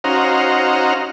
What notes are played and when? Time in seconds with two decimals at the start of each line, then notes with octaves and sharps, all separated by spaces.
0.04 C#4 D#4 F#4 C5 F5 A#5